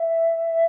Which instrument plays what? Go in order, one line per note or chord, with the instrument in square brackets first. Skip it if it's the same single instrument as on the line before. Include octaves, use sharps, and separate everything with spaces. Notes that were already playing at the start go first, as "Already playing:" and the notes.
Already playing: [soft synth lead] E5